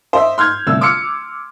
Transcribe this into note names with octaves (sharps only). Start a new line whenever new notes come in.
C5 D#5 E5
C6 F6 G6 G#6
G1 C2 A3 E6
C6 D6 E6 F6 C#7